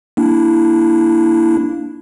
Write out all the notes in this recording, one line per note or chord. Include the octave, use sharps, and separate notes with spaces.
A#3 D4 E4